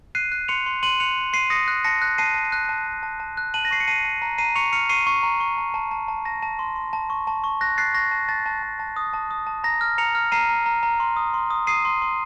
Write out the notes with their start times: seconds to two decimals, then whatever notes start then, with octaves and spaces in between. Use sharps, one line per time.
0.15 F#6 C7 D#7
0.32 F#6
0.48 C6 C#7 F7
0.66 C6
0.83 C6 D#7 F#7
1.00 F#6 C#7 F7
1.17 F#6
1.33 C6 C7 D#7
1.50 D#6 A#6 C#7
1.68 F#6
1.84 A5 A#6 C#7
2.02 F#6
2.18 A5 C7 D#7
2.35 A5
2.52 F#6
2.69 A5
2.87 A5
3.03 A5
3.20 A5
3.37 F#6
3.54 A5 D#7 F#7
3.65 A#6
3.71 C#6 C7
3.80 C#7
3.87 A5 C7 D#7
4.05 A5
4.22 A#5
4.38 A#5 C7 D#7
4.56 C#6 C#7 F7
4.72 F6 C#7 F7
4.89 C#6 C7 D#7
5.07 C#6
5.23 A#5
5.40 C#6
5.57 A5
5.74 A5
5.91 A5
6.08 A5
6.25 A5 A#6
6.42 A5
6.59 C6
6.75 C6
6.93 A5
7.10 C#6
7.27 A5
7.44 C#6
7.61 F#6 A#6
7.77 F#6 A6 C7
7.94 C#6 A#6
8.11 A5
8.28 A5 A6
8.46 A5
8.62 A5
8.79 A5
8.96 D#6
9.13 A5
9.31 D#6
9.47 A5
9.64 A#5 A#6
9.81 F6
9.98 A#5 C#7 F7
10.15 F6
10.32 A#5 C7 D#7
10.49 A#5
10.66 A#5
10.83 A#5
11.00 C6
11.17 D#6
11.34 C6
11.50 D#6
11.67 D#6 C7 D#7
11.85 C6
12.02 C6